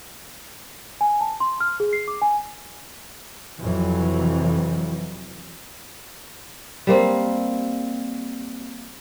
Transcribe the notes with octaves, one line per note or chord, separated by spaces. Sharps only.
G#5
A5
C6
F6
G#4
C7
D6
G#5
F2 C3 E3 F#3
G3 A#3 C4